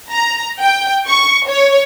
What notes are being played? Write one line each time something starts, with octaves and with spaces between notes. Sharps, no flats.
A#5
G5
C#6
C#5